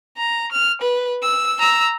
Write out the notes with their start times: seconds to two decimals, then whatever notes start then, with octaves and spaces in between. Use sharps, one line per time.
0.17 A#5
0.52 F6
0.82 B4
1.23 E6
1.59 A#5 E6